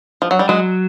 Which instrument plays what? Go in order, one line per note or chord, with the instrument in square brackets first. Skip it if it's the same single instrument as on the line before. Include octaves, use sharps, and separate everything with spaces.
[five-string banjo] F3
F#3
G3
[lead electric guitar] F#3 [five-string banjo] G#3